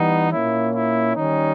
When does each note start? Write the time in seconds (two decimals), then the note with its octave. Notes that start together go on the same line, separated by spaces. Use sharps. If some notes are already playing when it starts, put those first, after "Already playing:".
Already playing: E3 G3 B3 D#4
0.33 A#2 A#3 C#4 E4
0.75 E4
1.15 D#3 G3 C#4 D#4